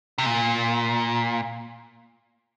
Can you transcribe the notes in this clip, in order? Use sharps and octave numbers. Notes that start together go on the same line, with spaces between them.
C3
A#2